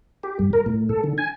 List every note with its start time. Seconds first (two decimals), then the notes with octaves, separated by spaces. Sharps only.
0.23 G4
0.39 G2
0.53 A#4
0.66 A2
0.89 A4
1.04 D3
1.18 G#5